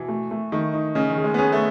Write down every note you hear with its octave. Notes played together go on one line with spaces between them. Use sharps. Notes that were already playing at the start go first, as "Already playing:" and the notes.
Already playing: B2 E3
A3
A3
D#3 A3
D#4
C#3 D#5
D#3
G#4
G#3
B3
C#4 G#4
A3